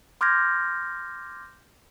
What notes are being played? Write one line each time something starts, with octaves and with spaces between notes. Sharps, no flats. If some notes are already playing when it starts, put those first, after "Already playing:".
C6 D6 F6 G6 G#6 A#6